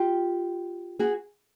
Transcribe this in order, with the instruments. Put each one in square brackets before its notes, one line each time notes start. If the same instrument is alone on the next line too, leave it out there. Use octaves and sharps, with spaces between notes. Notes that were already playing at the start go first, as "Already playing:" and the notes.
Already playing: [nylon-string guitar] F4 G4
F#4 G#4